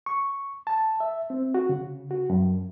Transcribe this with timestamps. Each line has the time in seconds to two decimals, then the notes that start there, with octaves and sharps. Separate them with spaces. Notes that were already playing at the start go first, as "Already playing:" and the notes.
0.06 C#6
0.67 A5
1.00 E5
1.30 C4
1.54 F#4
1.69 C#3
2.11 F#4
2.30 F#2